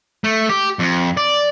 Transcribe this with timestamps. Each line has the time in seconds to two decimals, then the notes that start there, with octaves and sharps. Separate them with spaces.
0.24 A3
0.49 G4
0.79 F2
1.17 D5